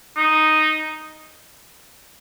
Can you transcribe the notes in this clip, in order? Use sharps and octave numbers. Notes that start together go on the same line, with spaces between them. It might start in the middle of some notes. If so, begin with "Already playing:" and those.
D#4